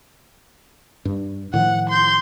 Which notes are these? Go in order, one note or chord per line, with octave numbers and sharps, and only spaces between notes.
G2
A2 D#3 F3 F#5
C6 G6